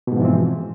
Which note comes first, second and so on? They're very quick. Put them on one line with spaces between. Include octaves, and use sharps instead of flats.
B2 G#2 F3 E3 C4